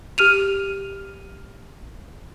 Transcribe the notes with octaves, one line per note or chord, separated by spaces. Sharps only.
G4 F6 D#7 F7